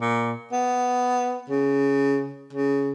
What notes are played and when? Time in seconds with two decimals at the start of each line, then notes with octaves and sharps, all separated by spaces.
0.01 A#2
0.52 B3
1.50 C#3
2.53 C#3